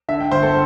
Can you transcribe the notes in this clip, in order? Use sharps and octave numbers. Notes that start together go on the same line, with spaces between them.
D3 E5
G5
G1 C5
A4